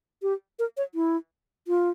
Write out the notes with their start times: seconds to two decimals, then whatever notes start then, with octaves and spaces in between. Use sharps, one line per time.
0.22 G4
0.59 A#4
0.77 C#5
0.95 E4
1.68 F4